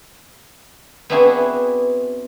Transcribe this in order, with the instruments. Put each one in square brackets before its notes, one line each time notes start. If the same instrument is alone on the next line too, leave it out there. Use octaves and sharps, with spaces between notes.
[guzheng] B3 C4 D4 E4 F#4 G#4